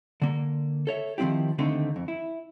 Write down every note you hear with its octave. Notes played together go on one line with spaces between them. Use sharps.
D3 A#3
A4 C#5 E5
D#3 F3 A3 C4 E4 G4
D#2 D3 A3 C4 D#4
F2
E4